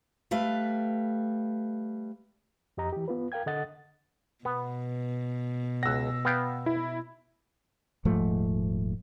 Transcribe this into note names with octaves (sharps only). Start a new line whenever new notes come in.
G3 A3 B4 F5
F2 G4 D#5 A#5
E3 G4
B3 F4 B4
A#4 F5 G5 G#6
D3 A4 D#5 F#5 A6
B2 B3
C#2 F#5 E6 A#6
B3 F5 G5
E4
D#1 G#2 F3 A3